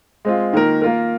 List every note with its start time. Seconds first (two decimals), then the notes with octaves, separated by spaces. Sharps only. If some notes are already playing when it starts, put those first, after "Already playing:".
0.25 G#3 C4 F4
0.53 D#3 A#3 F4 A#4
0.82 A#3 F4 A#4